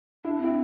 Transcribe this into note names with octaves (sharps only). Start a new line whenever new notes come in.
D4 E4
C4 E4